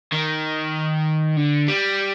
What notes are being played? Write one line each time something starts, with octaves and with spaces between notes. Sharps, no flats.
D#3
D3
G3